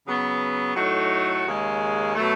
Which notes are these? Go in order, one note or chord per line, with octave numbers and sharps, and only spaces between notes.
C#3 F#3 B3
A2 F#3 A3 D#4 F#4
D#2 C#3 G#3
B2 F#3 A3